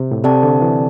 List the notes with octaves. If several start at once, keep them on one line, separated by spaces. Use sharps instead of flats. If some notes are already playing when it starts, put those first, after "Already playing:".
Already playing: C3
A2
C3 C4 A4 D5 A5
D3
E3